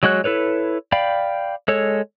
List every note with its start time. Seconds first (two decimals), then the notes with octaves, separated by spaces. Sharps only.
0.03 F#3 G#3 F#4 C#5 F#6
0.24 E4 A4 B4 C#5
0.92 D5 F5 G5 B5
1.68 G#3 A4 C#5